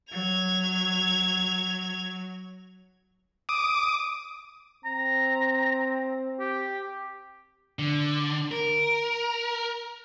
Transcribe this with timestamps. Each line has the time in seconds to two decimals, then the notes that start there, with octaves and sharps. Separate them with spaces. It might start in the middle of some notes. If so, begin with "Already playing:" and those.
0.12 F#3 G#6 F7
3.49 D6 D#6
4.85 C4 A#5
6.40 G4
7.79 D3
8.52 A#4